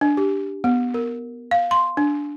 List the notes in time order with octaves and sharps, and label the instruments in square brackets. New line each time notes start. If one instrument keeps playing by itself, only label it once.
[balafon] D4
G4
B3
A#4
F5
C6
D4